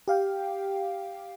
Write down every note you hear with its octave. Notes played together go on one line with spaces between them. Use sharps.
G4 F5 G5